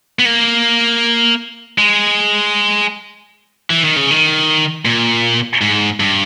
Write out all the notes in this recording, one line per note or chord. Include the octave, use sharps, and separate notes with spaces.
B3
A#3
G#3
E3
D#3
C#3
D#3
A#2
G#2
G2